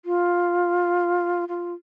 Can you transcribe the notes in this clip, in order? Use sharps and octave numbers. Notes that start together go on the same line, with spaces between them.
F4
F4